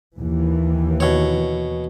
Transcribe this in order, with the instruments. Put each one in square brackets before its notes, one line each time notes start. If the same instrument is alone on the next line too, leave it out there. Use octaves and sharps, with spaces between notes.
[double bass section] D#2 E3
[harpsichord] B2 C#5